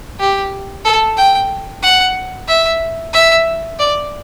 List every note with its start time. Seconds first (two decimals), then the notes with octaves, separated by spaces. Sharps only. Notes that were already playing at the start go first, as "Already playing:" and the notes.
0.20 G4
0.85 A4
1.17 G5
1.82 F#5
2.48 E5
3.13 E5
3.79 D5